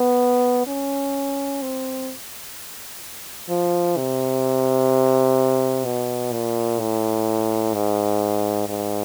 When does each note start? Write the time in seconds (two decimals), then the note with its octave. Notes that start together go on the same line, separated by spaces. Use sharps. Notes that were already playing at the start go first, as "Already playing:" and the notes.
Already playing: B3
0.67 C#4
1.62 C4
3.50 F3
3.97 C3
5.85 B2
6.32 A#2
6.80 A2
7.74 G#2
8.69 G#2